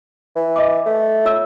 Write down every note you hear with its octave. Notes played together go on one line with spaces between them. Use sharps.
E3
D#5 B5 D6
A3
F4 C#5 E6